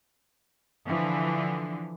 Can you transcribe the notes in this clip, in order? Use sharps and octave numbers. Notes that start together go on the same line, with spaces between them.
D3 E3 F3